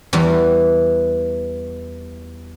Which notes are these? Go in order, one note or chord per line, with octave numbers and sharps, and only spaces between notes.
E2 E3 G3